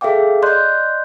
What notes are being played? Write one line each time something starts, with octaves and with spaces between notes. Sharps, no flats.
G#4 A4 E5 F5 G5 D6
D5 D#5 C6 F#6 G6